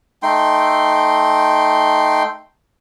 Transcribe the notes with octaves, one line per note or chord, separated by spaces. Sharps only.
A3 D#4 G5 C6